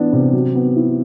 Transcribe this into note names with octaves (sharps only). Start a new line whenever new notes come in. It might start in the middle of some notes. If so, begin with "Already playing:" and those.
Already playing: E3 B3 D4
C3
F#3
B3
E4